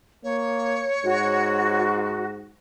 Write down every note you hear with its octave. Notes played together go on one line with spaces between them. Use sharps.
A#3 C#5
G#2 F#4